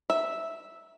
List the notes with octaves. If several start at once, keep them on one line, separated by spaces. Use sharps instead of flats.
E5